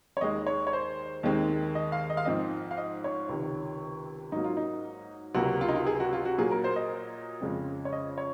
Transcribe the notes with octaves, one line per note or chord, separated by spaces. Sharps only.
C#5
D#2 D#3 G#3 D#5
C#5
C#5
C5
D#2 D#3 G#3 C4
D#5
F5
D#5
F5
G#2 F3 C4 D#5
F5
D#5
C#5
C#2 C3 D#3
G#2 F#3 A#3 D#4
F4
D#4
C#2 C3 F#3 A#3 F#4
F4
D#4
F4
G#4
F#4
F4
F#4
A#2 F#3 A#3 G#4
A#4
C5
D#5
F2 C#3 G#3 C4
C#5
D#5
C#5